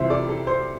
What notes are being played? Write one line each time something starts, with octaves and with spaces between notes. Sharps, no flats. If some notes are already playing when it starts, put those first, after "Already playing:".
Already playing: C2 C3 E3 C5 E5
A4 D5
A4
C5